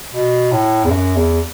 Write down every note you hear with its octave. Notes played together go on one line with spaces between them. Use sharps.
B2
A2
E2
F#2
E2